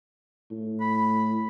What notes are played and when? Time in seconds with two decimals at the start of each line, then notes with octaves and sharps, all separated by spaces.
0.51 A2
0.81 B5